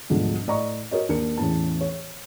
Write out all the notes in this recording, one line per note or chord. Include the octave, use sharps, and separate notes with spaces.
D2 G#2 B2 D3 F3 G3
A2 D5 D#5 A#5 C#6
F#4 A#4 C#5 D#5
D#2 D4 A#4 C#7
E2 A2 E3 C#4 A5
C#5